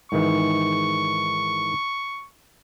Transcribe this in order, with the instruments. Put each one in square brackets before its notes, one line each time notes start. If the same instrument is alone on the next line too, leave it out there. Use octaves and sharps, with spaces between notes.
[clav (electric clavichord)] G#2 D#3 E3 [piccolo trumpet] C#6